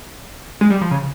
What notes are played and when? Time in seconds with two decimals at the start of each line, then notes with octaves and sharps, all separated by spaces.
0.61 G#3
0.70 G3
0.81 F3
0.91 C#3